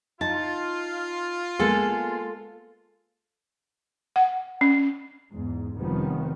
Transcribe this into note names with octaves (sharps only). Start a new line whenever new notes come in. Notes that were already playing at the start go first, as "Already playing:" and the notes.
D#4 F4 A5
G#3 A#3 B3 A4
F#5
C#4
E2 G#2
F1 D#3 F3 G3 B3 C#4